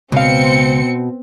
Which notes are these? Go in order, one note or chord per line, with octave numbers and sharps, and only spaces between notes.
C#2 B2 C4 F5 C#7